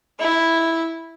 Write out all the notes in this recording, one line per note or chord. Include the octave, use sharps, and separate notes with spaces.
E4